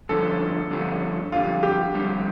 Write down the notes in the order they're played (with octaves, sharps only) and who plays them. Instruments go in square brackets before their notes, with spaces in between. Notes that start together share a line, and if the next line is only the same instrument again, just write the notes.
[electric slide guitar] G2 D3 F3 C#4 [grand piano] A4
[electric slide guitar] G2 D3 F3 C#4
[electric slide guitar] F2 D3 G3 [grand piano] F4
[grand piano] G4
[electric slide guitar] F2 D3 G3